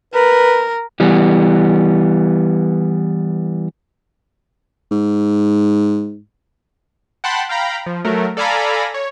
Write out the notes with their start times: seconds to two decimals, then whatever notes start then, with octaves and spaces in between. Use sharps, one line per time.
0.14 A#4 B4
1.00 E3 G3 B3
4.92 G#2
7.24 F#5 G5 A5 B5 C6 F#6
7.49 F5 G5 A#5 B5
7.86 F3
8.05 F#3 A3 A#4
8.37 A4 D5 F5 G#5 A#5 B5
8.94 C#5